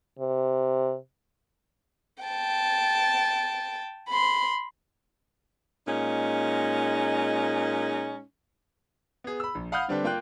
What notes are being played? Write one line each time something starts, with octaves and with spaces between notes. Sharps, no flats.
C3
G5 A5
B5 C6
A#2 G#3 C#4 D#4
B3 G#4
B5 E6
A#1
F5 F#5 B5 D#6 F6 G6
D3 G3 C4 D4 A4 B4
A#3 F4 G5 F#6